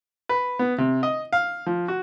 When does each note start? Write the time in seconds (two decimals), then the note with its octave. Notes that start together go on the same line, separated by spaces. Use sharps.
0.29 B4
0.59 B3
0.78 C3
1.03 D#5
1.33 F5
1.66 F3
1.88 F#4